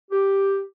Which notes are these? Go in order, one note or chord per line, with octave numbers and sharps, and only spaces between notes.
G4